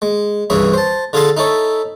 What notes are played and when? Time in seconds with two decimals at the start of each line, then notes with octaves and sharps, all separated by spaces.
0.02 G#3
0.50 C2 G2 E3 C#4 E4 G#4
0.74 C5 A5
1.13 D3 F4 G#4 A4 G#5 C6
1.37 D#4 E4 A4 C#5